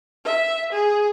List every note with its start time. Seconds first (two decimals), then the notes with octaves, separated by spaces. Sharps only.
0.25 E5
0.72 G#4